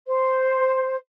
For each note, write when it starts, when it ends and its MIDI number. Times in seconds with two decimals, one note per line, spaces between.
0.08 0.96 72